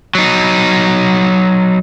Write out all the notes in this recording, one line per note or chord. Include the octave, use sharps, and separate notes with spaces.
F#3 D#4